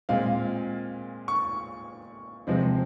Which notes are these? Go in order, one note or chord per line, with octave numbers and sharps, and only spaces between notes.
A#2 G#3 C4 F5
C#6
C3 F3 G#3 C4